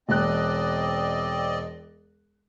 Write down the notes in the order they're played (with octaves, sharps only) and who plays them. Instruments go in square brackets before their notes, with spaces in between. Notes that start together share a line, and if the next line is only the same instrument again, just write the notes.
[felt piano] E1 F#6 [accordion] C4 D5 D#5